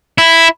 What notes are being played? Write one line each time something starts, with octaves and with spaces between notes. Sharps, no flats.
E4